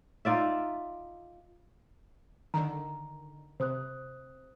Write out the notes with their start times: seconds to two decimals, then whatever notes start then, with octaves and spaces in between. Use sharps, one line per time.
0.25 D#4 F4 D5 E5
2.54 D3 D#3 A#5
3.60 C3 C5 D#6 F#6